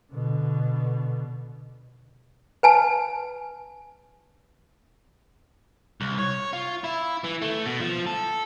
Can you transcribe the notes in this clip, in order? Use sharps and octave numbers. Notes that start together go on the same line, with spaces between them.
B2 D3
B4 G#5 A5
C2
C#5
F4
E4
E3
A3
B2
F3
A4